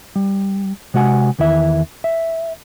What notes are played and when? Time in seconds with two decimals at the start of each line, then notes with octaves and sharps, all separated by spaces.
0.16 G3
0.94 C3 G#3 F#4 F#5 G#5
1.39 E2 D#3 E4 E5
2.04 E5